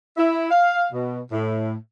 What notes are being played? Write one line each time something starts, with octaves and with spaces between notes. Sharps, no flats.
E4
F5
B2
A2